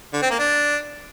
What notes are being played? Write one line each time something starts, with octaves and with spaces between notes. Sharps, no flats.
D3
C4
A#3
D4